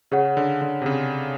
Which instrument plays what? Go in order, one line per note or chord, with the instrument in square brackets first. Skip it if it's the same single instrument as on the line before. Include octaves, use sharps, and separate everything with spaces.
[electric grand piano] C#3 [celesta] G#4 C#5 F#5
[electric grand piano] D3
D3
C3
C#3